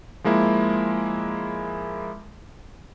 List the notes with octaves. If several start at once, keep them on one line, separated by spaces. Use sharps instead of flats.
F3 G#3 A#3 E4